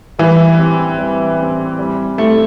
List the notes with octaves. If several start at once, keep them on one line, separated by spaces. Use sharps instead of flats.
E3 G3
C4 E4 G4
G3
C4 E4 G4
G3
A3 C4 E4 G4